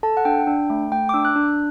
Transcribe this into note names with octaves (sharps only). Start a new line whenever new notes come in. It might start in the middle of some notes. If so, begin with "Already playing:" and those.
A4 A5
F#5
D4 G5
D4
A3
A3 G5
D6
D4 E6
F#6
D4